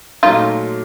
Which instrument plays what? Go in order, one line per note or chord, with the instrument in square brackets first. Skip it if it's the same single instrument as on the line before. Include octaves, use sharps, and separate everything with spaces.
[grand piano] A#2 F#3 A3 C#4 [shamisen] D#4 F4